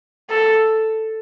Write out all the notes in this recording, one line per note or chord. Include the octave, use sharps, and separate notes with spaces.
A4